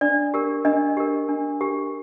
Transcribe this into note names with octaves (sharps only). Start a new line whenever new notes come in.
D4 D5
G4 A#4
D4 D#5
G4 A#4
D4
G4 A#4